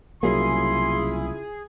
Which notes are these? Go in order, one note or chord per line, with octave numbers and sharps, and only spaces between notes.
C2 C#3 F#3 A#3 E4 F4 G#4 C6